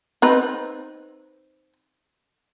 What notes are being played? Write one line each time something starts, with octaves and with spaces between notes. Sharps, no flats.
C4 D#4 B4